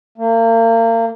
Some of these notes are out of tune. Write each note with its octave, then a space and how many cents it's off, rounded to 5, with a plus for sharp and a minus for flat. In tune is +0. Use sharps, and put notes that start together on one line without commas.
A#3 -35